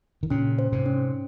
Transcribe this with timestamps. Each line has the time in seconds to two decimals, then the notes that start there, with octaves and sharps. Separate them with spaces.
0.23 D#3
0.30 A#2 C#3 C#4
0.59 C5
0.72 G#2 C3
0.86 C#4